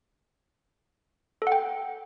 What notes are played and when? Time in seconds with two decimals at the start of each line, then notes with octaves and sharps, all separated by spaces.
1.42 A4
1.47 F#5
1.52 G5